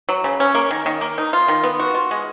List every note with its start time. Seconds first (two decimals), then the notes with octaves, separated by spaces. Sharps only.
0.09 F#3
0.24 C#3
0.40 C#4
0.55 A#3
0.71 D#3
0.86 D#3
1.01 A#3
1.18 D#4
1.33 F4
1.48 D#3
1.64 B3
1.80 F#4
1.95 F4
2.11 G#3